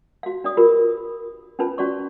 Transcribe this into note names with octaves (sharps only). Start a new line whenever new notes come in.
F#4 F5
D4 D5 D#6
F4 G4 A#4 B4
C#4 D4 F4 B4 A5
C#4 F#4 D5 C#6